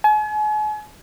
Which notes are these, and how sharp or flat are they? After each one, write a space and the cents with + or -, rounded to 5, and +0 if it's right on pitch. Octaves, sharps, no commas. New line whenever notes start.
G#5 +40